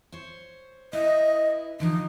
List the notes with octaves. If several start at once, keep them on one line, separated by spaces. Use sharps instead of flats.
C5 C#5
E4 B4 D#5
D3 E3 F3 D#4